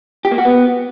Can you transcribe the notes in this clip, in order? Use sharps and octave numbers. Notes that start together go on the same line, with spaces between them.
G4
A#3
F#4
B3